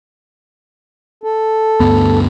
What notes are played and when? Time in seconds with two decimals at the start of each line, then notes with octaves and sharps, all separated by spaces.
1.23 A4
1.80 D2 G2 B3